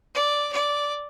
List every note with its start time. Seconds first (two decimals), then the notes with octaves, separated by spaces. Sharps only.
0.15 D5
0.52 D5